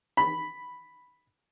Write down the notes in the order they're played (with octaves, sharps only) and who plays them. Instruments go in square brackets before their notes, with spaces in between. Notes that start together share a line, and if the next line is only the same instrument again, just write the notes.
[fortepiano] B5